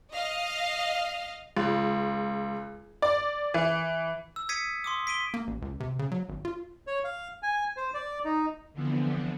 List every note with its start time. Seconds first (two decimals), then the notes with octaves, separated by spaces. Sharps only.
0.13 D#5 F5
1.57 C#2
3.02 D5
3.54 E3
4.36 E6
4.49 D#6 G#6 B6 C#7 D#7
4.84 C6 D6 D#6
5.07 B6 D7 D#7 G7
5.34 A#3
5.47 A1
5.62 C#2
5.80 C3
5.99 C#3
6.12 F#3
6.29 G#1
6.45 F4
6.87 C#5
7.04 F5
7.43 G#5
7.77 C5
7.94 D5
8.25 D#4
8.73 D3 E3 F3 B3 C4